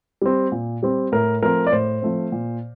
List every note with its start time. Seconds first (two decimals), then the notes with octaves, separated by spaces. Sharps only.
0.22 G3 C4
0.52 A#2
0.83 G3 C4
1.12 A2 A#4
1.43 F3 A3 C4 A#4
1.67 D5
1.72 A2 C5
2.02 F3 A3 C4
2.32 A#2